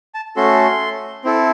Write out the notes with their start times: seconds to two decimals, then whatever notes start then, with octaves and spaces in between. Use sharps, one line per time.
0.14 A5
0.36 A3 C#4 F#4 A4 C6
1.24 C4 E4 A4